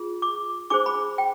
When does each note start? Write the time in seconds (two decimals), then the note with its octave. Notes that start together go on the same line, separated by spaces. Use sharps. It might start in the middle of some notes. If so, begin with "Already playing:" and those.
Already playing: F4 G#4
0.22 D6
0.70 D4 G#4 C5 D6
0.86 B5
1.18 G5